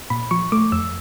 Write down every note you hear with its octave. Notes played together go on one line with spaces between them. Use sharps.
A#2 B5
F3 C#6
A3 D6
F2 E6